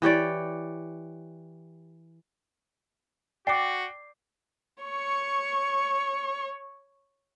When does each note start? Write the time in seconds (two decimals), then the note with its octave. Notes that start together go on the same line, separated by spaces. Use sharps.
0.02 E3 G4 C#5 D5
3.47 F#4 D5 G5 D6 C7
4.82 C#5 C#6